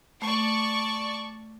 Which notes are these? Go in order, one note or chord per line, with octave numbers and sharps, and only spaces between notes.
A3 D5 A5 C#6